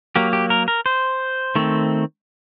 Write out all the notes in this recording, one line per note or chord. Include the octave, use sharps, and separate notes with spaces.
F#3 A#3 G4
G4
A#4
A#4
C5
D#3 A3 C4